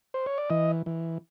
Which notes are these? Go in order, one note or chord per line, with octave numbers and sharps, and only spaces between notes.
C5
C#5
D5
E3 D#5
E3